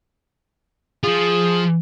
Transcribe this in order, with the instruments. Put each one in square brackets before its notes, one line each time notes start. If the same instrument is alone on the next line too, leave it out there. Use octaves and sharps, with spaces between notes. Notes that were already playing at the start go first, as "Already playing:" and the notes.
[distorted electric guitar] F3 F4 [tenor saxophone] G#4